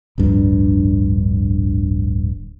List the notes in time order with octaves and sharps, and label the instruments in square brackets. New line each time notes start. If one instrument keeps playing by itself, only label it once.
[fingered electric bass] D1 A#1 G2 D4